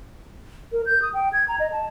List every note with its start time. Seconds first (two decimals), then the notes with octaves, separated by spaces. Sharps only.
0.72 A#4
0.86 G6
1.02 D#6
1.14 G5
1.33 G#6
1.48 A#5
1.60 D#5
1.72 A5